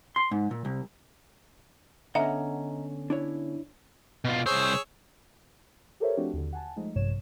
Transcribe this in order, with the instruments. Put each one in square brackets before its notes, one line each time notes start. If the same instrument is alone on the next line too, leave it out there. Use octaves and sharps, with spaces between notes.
[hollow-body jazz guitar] C6
G#2
A#2
C2
[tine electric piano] D3 B3 C#4 [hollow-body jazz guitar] D#5 F#5 A#5 [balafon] E5
[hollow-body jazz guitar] D4 E4 C#5
[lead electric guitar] B2 F4
[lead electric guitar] C2 C5 [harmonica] G#4 C#5 E6
[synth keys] G4 A4 A#4 C5 C#5 E5
F3 A3 C4 D4 F#4 G4
D#2 D3
F#5 G#5 A5
F3 G#3 A3 D#4
A#1 G2 C3 C#5 E7